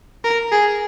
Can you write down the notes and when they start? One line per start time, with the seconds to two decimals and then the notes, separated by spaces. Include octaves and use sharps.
0.24 A#4
0.52 G#4